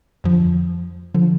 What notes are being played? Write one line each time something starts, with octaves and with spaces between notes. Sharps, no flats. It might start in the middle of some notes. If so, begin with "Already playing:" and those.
F2 D3 F3
D3 F3